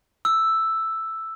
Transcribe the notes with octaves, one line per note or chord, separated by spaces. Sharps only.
E6